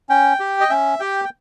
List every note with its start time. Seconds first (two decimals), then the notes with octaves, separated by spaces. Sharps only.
0.09 C#4 G5
0.40 G4
0.61 D#5
0.69 C#4 E5
1.00 G4 G5
1.25 G5